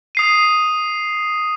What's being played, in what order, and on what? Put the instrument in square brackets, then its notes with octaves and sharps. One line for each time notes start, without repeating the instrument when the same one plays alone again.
[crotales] D#6 C7 D#7